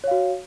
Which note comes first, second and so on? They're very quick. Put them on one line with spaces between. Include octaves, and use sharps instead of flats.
C#5 F5 F#4